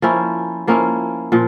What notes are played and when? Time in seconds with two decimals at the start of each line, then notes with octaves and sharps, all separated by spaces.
0.02 F3 A#3 C#4 E4
0.67 F3 A#3 C#4 E4
1.32 A#2 F3